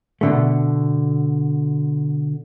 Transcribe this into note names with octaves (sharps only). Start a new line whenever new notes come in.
B2 D3 A3